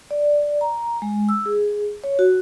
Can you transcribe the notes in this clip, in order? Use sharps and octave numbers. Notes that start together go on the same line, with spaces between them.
D5
A#5
G#3
E6
G#4
C#5
F#4